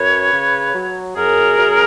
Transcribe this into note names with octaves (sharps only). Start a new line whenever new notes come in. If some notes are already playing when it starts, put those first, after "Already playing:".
Already playing: F#2 B4 C#5
C#3
F#3
F#2 G#4 A#4
F#2